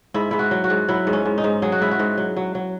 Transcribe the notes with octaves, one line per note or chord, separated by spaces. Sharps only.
G#2 E4
G#2 E4
F#4
F#3
F#4
G#2
F#3 E4
G#2
C#4
G#2
D#4
G#2
F#3 G#4
F#4
G#2 E4
F#4
G#2
F#3
F#3
F#3